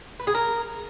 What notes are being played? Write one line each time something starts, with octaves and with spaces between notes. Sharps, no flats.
B4
G#4
A#4